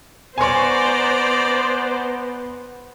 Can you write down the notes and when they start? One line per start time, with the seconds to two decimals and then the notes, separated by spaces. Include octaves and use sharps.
0.38 B3 C5 D5 G#5 A#5 C6 C#6